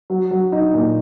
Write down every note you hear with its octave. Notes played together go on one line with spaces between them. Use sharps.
F#3
F#3
D#4
A#2